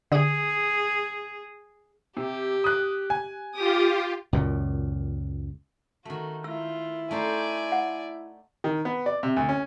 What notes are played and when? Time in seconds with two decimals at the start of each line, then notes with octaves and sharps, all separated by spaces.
0.12 D3 G#4 D#6
2.17 C3 G4
2.64 D#6 F#6
3.10 G#5
3.55 F4 G4 D6 D#6
4.33 C#2 F#2 A#2
6.05 D#3 A3 F#4
6.44 E4 F4 E6
7.11 A3 D#4 C5 D5 G#5
7.72 F#5
8.64 D#3
8.85 B3
9.06 D5
9.23 C3
9.37 D2
9.49 C#4